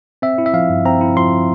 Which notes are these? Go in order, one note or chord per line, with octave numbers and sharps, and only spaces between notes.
C4 E5
E4
E5
F3 F5
G2
C4 A#5
E4
F3 C6